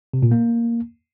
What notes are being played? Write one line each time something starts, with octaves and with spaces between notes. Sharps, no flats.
C3
A#2
A#3